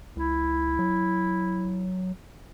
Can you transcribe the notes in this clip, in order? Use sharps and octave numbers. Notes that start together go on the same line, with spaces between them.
C#2 E4
F#3